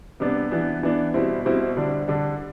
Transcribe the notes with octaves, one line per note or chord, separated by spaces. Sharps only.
C3 G3 B3 D4
E3 B3 D4
E3 B3 D4
B2 G3 C4 E4
B2 G3 C4 E4
D3 G3 D4
D3 G3 D4